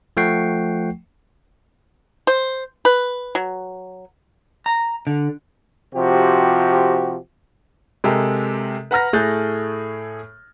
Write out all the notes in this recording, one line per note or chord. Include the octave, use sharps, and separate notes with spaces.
F3 A3 F#5 G5 C#6 C7
C5
B4
F#3
A#5
D3
C3 F3 F#4 G4
C3 G#3 G4 A4 A#4
B4 F#5 A#5 F6 A#6
A2 A3 G#4 F#6 G6 A6